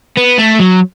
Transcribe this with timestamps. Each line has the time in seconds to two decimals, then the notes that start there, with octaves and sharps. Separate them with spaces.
0.17 B3
0.38 A3
0.60 F#3